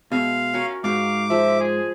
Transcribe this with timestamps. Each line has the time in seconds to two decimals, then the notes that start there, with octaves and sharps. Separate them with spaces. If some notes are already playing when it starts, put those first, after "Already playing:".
0.12 B2 G#3 E5 F5
0.54 C#4 F#4 A#4
0.84 G#2 D#4 F#4 F5 D6
1.30 F3 G#3 E5
1.61 G#4